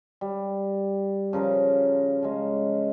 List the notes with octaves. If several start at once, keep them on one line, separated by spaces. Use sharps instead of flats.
G3
C#3 F3 A#4
C#3 G#3